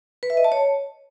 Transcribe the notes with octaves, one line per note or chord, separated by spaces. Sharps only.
B4
E5
D#5
A5
C#5